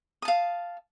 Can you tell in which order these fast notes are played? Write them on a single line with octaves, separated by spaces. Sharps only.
D#6 A5 F5